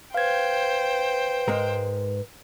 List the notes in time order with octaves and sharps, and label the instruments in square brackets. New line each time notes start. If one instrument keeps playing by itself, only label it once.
[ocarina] B4 [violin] C5 G5 [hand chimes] F5 G#6
[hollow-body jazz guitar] G#2 G#3 A#4